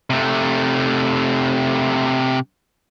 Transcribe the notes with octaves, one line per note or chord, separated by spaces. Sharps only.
C3 A3